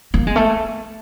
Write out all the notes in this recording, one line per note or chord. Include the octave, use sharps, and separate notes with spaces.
A#3
G#3
A3